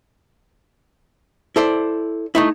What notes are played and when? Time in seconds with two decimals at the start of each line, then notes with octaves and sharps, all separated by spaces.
1.56 E4 A4 C5 D5
2.35 A3 D#4 E4